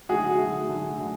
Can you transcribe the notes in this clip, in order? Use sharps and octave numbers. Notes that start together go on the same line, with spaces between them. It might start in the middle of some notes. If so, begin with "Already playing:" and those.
D3 F#3 A3 F#4 G#4
D3 F#3 A3
D3 F#3 A3
D3 F#3 A3